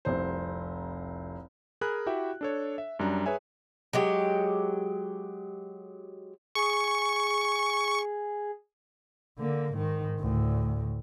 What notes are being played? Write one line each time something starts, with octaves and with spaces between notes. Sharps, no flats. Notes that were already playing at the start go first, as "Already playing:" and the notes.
F1 C2 C5
G#4 A#4 G#5 B5 F#6
E4 F#4 G4 E5 G5
D4 A4 C#5
E5
F#2 G3 D4 A#5
G#4 B4 C#5 E5 G#5
F#3 G#3 G4
G#4 C#6
D3 A#3
G#2 D#3
D2 A2